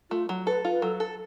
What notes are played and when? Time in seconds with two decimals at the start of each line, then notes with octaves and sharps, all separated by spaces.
0.10 A3 F4
0.29 F#3
0.47 A4 B4
0.65 F4
0.71 B4
0.82 F#3 A4
1.00 A4